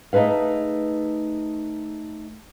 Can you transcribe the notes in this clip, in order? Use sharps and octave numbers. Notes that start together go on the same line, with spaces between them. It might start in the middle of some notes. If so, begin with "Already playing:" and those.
A3 D#4 G#4 B4 F5